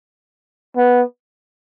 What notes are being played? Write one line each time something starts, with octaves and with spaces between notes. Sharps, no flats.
B3